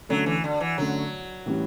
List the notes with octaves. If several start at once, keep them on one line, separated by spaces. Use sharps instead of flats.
D3 F#3 A3 C#4
E3
D3
E3
D3 F#3 A3 C#4
A2 E3 G3 C#4